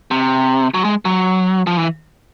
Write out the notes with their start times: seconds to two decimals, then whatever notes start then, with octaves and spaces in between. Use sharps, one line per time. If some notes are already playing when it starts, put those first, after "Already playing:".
0.11 C3
0.74 F#3
0.85 G#3
1.05 F#3
1.67 F3
1.77 E3